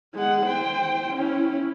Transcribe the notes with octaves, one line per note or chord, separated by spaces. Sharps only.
G#3 F#5
C5 G5
C#4 E4